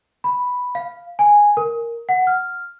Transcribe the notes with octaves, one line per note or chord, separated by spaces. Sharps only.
B5
F5
G#5
A#4
F#5
F6